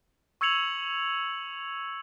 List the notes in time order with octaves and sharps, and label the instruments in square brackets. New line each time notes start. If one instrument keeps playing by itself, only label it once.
[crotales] C#6 E6 G#6 C#7 F7 F#7